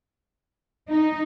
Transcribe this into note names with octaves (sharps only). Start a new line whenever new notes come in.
D#4